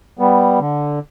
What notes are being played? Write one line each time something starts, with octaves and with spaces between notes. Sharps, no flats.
G3 B3
D3